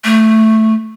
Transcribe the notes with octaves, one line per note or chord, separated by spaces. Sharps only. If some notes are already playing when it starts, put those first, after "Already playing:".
A3